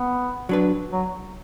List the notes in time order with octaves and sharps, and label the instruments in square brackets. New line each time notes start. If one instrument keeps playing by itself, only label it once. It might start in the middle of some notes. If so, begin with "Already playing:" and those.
Already playing: [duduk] B3
[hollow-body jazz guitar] F#3 D4 B4
[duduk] F#3